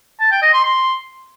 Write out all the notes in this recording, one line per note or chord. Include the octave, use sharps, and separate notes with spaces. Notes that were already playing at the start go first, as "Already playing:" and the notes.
A5
G5
D#5
C6
C6